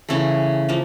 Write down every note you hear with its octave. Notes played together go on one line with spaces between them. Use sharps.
C#3 E3 A3
F3 A#3